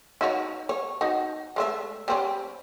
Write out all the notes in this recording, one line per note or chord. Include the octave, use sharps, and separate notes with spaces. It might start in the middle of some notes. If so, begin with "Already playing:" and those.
D#4 F#4 C#5
C#5
D#4 F#4
G#3 A3 E5
G3 C4 C#4